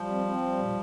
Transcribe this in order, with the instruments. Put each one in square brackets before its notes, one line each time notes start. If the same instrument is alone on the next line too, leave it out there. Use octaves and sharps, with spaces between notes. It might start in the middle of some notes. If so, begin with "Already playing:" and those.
Already playing: [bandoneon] F3 [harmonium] G3
[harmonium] C4
C4
G3
A#2